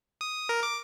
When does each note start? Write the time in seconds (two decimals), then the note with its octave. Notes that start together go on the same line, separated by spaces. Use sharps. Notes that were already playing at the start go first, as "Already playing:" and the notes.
0.21 D#6
0.49 A#4
0.63 D6